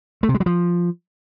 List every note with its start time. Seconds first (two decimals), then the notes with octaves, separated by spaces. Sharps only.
0.23 A3
0.29 C3
0.35 G#3
0.40 F#3
0.46 F3